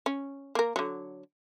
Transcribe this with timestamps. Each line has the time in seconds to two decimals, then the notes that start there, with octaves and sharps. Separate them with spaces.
0.06 C#4
0.55 A#3 A#4
0.76 D3 F#3